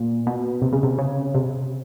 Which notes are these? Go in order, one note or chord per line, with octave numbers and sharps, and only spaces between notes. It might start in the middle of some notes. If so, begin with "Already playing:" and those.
Already playing: A#2
B2
C3
C#3
C3
C#3
C3